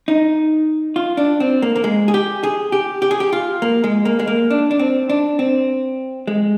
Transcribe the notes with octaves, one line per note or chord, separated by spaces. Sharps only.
D#4
F4
D4
C4
A#3
A#3
G#3
G#4
G4
G#4
G4
G4
G#4
G4
F4
A#3
G#3
A#3
G#3
A#3
D4
D4
C4
D4
C4
G#3